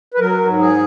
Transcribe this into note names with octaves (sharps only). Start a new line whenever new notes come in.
B4
F#3 A#4
G#2
G#4